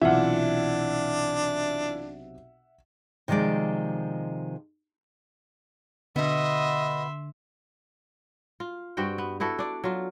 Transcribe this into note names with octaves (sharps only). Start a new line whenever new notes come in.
B1 C3 E3 D4 F4 E5 F#5
C3 D#3 F3 G#3 D5
B2 D3 B3 D#5 E5 C6
F4
G2 C4 F#4 G5
B3
B3 E4 F#4 A4
D4 D5
F#3 F4